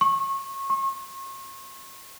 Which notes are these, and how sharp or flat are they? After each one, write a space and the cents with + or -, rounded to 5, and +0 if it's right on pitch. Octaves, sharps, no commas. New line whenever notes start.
C#6 -25
C#6 -40